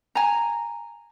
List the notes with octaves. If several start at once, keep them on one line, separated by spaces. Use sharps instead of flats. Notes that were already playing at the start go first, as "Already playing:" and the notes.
G#5 A#5